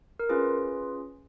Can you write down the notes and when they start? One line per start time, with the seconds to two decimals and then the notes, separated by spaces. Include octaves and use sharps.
0.20 A#4
0.29 C#4 F4 G#4 B4